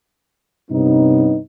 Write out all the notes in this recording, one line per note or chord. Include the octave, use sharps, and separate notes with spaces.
G2 C3 B3 C#4 D#4